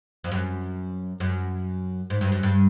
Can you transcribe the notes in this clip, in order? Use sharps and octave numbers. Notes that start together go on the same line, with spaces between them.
F2
F#2
F#2
G#2
G2
F#2
G2